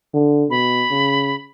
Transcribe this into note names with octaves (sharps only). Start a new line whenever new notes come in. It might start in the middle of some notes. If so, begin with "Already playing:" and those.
D3
B2 B5
C#3